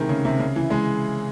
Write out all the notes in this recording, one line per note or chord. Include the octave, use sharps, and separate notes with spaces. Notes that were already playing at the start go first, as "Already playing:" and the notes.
Already playing: C3 D#3 E3 G#3 A3
C#3
C3
C#3
E3
G#3